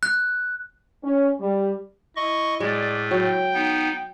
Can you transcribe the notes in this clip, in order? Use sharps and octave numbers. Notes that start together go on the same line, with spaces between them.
F#6
C#4
G3
E4 D#5 C#6
A2 G#3 D5
F#3 G5
B3 D#4